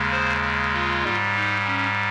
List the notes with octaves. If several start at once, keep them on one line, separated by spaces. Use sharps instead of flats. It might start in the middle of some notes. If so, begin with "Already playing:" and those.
Already playing: D#2 C#3 G#3
C5
F4
G#2 G3
D#4
C#4